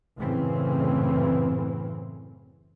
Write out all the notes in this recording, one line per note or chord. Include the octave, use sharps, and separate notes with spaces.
F#2 A2 C#3 E3 C4